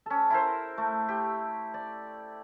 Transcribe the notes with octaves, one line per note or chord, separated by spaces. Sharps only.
C#4 A4
E4 A#4 C5
A3
G4
D5